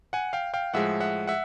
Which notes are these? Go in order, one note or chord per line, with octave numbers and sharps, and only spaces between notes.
F#5 G#5
F5 G5
F5 G5
A2 F3 G#3 E5 F#5
E5 F#5
E5 F#5